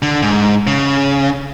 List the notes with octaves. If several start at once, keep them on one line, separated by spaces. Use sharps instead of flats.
D3
G#2
C#3